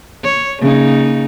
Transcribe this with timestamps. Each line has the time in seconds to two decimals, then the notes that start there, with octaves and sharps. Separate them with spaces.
0.24 C#5
0.61 C#3 A#3 D#4